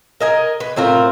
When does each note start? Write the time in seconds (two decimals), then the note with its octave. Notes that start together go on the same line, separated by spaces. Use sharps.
0.20 A#4 D#5 G#5
0.60 B4
0.76 A2 C4 F4 A#4